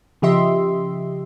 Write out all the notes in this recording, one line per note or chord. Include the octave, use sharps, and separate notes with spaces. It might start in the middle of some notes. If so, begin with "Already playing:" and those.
C#3 F3 G4 D#5 E5 C6